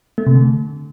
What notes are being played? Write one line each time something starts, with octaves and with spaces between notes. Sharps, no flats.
A3
C3
D3